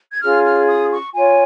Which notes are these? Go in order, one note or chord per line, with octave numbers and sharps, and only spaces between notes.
G#6
C#4 F4 G#4 F6
F6
D#6
C#6
F4 C#5 G#5